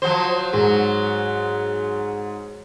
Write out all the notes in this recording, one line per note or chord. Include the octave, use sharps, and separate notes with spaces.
F3 F#3 C5
G#2 F#3